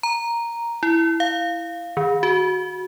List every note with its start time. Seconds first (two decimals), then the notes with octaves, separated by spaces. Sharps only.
0.03 A#5
0.83 E4
1.20 F5
1.97 D#3
2.23 F#4